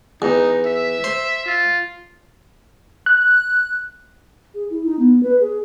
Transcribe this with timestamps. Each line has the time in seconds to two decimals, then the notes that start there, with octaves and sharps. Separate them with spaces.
0.22 E2 D#4
0.66 E5
1.04 C5
1.46 F4
3.06 F#6
4.54 G#4
4.70 E4
4.86 D#4
4.99 B3
5.23 B4
5.40 G#4